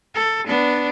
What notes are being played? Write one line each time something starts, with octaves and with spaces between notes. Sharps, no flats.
A4
B3 D4